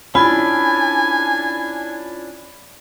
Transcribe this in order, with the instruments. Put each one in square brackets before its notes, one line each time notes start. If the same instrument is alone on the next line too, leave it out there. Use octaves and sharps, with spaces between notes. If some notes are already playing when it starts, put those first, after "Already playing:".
[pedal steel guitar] C#4 D4 [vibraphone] E4 F4 [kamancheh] G#5 [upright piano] B5